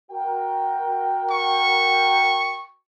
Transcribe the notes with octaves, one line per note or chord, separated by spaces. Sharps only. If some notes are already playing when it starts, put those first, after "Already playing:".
F#4 A#4 G5
C#6